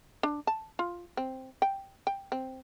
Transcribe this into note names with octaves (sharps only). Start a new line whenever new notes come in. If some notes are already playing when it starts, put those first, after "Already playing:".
D4
A5
F4
C4
G5
G5
C4